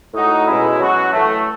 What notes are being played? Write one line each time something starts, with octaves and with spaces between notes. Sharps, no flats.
A2 G#3 D#4 F#4
B2 G#3 C#4 E4
F#3 C#4 F#4
A2 E3 A3